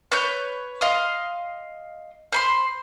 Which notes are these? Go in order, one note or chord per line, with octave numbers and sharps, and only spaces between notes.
B4 C#5 G6
D#5 F5 C6 D#6
C5 B5 C6